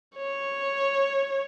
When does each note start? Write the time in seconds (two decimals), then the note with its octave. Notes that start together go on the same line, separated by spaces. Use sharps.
0.17 C#5